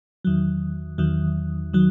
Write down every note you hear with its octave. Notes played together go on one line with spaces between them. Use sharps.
E2 D#3 F#3
E2 D#3 F#3
D#3 F#3